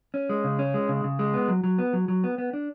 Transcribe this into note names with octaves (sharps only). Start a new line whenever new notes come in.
C#4
G#3
C#3
C#4
G#3
C#3
C#3
G#3
B3
F#3
F#3
B3
F#3
F#3
B3
B3
D4